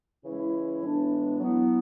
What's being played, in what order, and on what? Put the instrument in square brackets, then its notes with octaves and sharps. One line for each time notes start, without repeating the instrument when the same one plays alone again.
[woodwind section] C#3 E3 G#3 C#4 E4
A2 E3 G#3 B3 D4
F#3 B3 E4